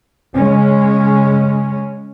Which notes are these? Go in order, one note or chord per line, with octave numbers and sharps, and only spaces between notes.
C#3 G#3 C#4